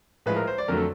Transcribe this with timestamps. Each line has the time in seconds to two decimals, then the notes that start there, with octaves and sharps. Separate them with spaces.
0.26 A2 F3 G#3 B4
0.36 A#4
0.47 C5
0.58 D5
0.68 F2 D3 F#3 A3 A#4
0.77 A4